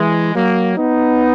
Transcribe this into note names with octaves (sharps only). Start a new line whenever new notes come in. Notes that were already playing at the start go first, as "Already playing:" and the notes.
Already playing: E3 G#3
F#3 A#3
B3 D#4